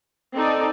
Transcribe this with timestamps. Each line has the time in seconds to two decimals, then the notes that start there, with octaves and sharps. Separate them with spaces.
0.34 C4 D#4 A4 D5